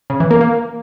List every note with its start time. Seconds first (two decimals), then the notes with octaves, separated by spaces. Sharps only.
0.10 C#3
0.20 E3
0.30 A#3
0.41 A#3